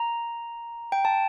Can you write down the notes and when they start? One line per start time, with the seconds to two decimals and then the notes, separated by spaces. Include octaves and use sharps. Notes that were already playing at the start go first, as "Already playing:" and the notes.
Already playing: A#5
0.92 G5
1.05 A5